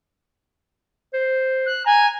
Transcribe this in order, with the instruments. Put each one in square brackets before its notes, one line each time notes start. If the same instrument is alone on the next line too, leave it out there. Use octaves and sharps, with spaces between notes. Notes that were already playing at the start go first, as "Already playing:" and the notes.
[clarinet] C5
[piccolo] F#6
[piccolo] G#5 [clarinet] A#5